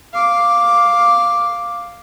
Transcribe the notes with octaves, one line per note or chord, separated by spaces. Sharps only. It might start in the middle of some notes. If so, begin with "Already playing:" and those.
F5 D6